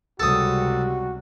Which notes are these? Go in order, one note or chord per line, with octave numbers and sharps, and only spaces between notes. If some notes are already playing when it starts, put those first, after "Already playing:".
C#2 C3 G3 F#4 A4 D#6